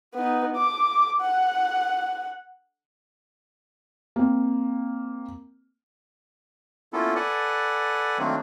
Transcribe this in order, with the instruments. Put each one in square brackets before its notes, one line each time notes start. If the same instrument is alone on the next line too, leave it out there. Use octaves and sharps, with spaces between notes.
[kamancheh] B3 D#4
D6
F#5
[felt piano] A#3 C4
[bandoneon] A#3 B3 C#4 E4 F4 A4
A4 B4 D5 F#5 G#5
D#3 F#3 A3 A#3 C4 D4